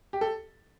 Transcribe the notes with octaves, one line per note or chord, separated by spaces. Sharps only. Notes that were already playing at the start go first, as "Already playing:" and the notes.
G4
A4